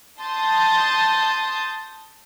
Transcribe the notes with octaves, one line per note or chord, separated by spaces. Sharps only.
A5 C6 D#6 G6 A6